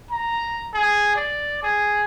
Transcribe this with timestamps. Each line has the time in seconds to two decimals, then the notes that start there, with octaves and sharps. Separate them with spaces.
0.11 A#5
0.74 G#4
1.16 D5
1.63 G#4